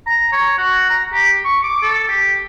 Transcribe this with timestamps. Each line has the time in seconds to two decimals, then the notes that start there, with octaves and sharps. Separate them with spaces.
0.06 A#5
0.32 C#5
0.58 F#4
0.90 A#5
1.13 G4
1.44 C#6
1.63 D6
1.83 A4
2.09 G4